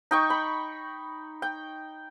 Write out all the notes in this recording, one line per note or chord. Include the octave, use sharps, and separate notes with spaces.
D#4 G5 C#6
B5
G5